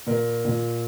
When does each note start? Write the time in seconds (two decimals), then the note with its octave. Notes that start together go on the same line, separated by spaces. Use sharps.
0.07 A#2 A#4
0.45 A#2